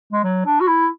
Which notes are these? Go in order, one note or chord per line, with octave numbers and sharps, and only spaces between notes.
G#3
F#3
D4
F#4
E4